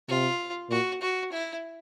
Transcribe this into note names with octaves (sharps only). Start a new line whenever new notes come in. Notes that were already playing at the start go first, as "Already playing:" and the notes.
C3 F4
A#2 F#4
F#4
E4